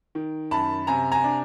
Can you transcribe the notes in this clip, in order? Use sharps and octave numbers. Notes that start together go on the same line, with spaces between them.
D#3
F#2 A5 B5
C3 G#5 A#5
G#5 A#5
D4